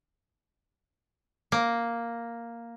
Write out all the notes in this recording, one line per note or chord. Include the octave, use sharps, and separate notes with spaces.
A#3